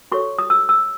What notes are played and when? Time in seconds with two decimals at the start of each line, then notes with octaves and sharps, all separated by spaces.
0.12 F#4 A4 C#5 C#6
0.39 D#6
0.50 E6
0.69 E6